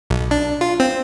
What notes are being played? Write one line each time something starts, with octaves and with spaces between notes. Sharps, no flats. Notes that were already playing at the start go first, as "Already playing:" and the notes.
B1
D4
F4
C4